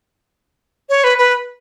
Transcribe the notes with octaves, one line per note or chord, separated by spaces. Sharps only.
C#5
B4
B4